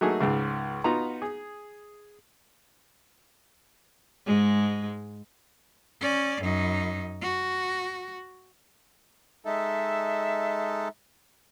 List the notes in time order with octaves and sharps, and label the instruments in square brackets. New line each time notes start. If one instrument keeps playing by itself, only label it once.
[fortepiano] F#3 A3 A#3 D#4 F#4 G#4
C#2 G#2 C#3
B3 D#4 F4 F#4 A#5
G#4
[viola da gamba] G#2 G#3
[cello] C#4 D5
F#2 D#4
F#4
[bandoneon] G#3 D#4 A4 [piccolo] E5